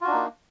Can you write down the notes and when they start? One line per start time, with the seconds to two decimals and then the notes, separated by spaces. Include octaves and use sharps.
0.01 F4
0.04 F#4
0.07 D4
0.11 D#4
0.14 A#3